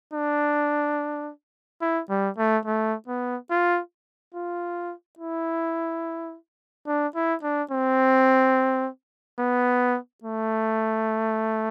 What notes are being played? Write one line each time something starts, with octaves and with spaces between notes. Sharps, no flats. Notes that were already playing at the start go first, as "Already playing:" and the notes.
D4
E4
G3
A3
A3
B3
F4
F4
E4
D4
E4
D4
C4
B3
A3